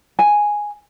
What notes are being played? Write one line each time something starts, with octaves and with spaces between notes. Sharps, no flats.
G#5